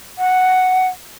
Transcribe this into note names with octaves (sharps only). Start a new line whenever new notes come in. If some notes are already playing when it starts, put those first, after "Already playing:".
F#5